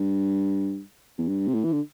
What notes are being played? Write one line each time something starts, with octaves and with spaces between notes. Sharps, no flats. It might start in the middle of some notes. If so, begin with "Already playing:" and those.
Already playing: G2
E2
G2
C3
A2
E3
D3